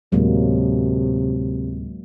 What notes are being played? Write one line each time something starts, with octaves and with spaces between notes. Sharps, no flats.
D2 A2 C3 F#3 G#3 A#3